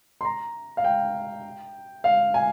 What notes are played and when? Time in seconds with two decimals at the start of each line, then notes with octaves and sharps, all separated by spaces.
0.21 C6
0.25 A#5
0.77 F5
0.84 G5
2.04 F5
2.34 G#5